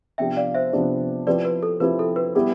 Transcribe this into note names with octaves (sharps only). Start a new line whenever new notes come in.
C3 F3 B3 D4 G4 E5 G5
D5 F5
C5 E5
C3 F3 B3 D4 G4
F3 C4 E4 G4 B4 D5
B4
A4
F3 C4 E4 G4 B4
A4
B4
G3 B3 E4 G4